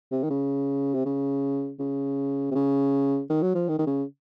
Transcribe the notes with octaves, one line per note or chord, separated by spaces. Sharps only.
C3
D#3
C#3
C3
C#3
C#3
C3
C#3
D#3
F#3
F3
D#3
D#3
C#3